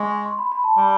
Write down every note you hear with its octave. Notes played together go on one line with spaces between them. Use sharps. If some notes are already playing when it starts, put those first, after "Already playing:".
Already playing: G#3 C#6 D6
C6
B5
B5
A5
G3